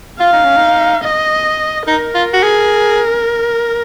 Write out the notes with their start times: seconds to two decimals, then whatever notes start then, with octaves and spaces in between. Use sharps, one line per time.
0.20 F4 F5
0.33 D#4
0.44 C#4
0.56 D#4
1.03 D#5
1.87 D#4 A#4
2.15 F4
2.33 F#4
2.43 G#4